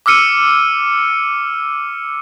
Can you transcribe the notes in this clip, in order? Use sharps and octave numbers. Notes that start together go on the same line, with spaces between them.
D6 E6 F6 C#7 D#7